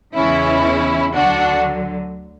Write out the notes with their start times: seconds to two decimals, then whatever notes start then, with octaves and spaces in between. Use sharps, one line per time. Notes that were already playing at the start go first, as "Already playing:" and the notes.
0.15 E2 C#3 E3 G#3 C#4 E4
1.14 D2 D3 F#3 D4 F#4